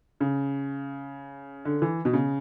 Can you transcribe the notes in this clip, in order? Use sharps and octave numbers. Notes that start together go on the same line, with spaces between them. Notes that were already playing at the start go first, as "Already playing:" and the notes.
C#3
D3
E3
B2
C#3